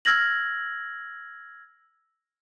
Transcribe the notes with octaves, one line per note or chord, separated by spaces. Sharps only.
E6 F6 G#6 A#6 F#7